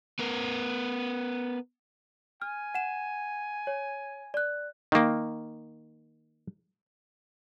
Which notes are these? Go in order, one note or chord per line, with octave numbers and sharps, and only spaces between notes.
B3 A#4
G#5 F6
F#5 E7
C#5
D5 F#6
D#3 A#3